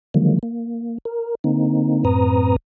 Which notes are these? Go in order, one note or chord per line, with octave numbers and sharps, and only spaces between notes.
D3 D#3 F3 F#3 G#3 A#3
A#3
A#4
D3 A#3 C4 D#4
F#2 A2 C4 B4 A#5 D#6